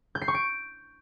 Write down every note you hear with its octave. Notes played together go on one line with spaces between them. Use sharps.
G6
C7
C#6
D7